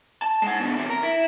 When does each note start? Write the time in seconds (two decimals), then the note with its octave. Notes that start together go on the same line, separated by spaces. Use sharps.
0.22 A5
0.42 G#3 F#5
0.60 B2 D3
0.77 E2 C3
0.89 A#4
1.03 E4